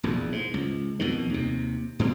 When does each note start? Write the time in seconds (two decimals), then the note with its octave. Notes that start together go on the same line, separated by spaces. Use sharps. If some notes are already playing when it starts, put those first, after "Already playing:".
0.03 E1 A#1 E2
0.32 G#2
0.54 C#2
0.99 F2 B2 D#3
1.30 D#2 C3
1.99 G2 B2 D3 C4